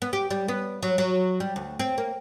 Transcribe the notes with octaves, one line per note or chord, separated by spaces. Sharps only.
B3
G4
G3
B3
F#3
F#3
G3
D2
C4
A#3